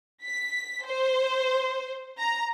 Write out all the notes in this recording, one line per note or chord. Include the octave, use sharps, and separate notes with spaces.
B6
C5
A#5